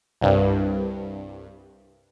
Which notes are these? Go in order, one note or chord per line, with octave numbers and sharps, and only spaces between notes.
C2 G2